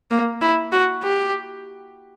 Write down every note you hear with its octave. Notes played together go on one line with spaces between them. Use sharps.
A#3
E4
F#4
G4